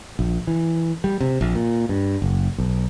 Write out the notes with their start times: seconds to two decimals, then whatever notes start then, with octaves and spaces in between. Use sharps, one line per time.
0.19 A#1
0.47 E3
1.04 G3
1.21 C3
1.41 A#1
1.55 A#2
1.89 G2
2.22 F#1
2.58 B1